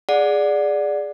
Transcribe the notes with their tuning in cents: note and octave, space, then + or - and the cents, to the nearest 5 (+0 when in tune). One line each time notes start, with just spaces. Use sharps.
G#4 +0 D5 +0 F#5 -25